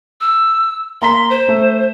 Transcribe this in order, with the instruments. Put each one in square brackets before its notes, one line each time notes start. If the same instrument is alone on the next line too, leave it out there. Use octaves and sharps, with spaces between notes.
[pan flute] E6
[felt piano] A#3 A#5 B6 [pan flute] C6
[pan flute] C5
[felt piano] A3